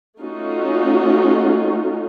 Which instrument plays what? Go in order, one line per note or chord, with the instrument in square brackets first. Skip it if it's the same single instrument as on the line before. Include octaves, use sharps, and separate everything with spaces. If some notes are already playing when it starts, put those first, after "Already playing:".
[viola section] A3 C#4 D#4 F4 F#4